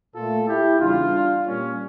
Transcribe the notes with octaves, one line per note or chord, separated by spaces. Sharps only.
A#2 A3 F4 A4
E4 G4
E2 C#3 G3 D4 F4
A#2 G3 A#3 C#4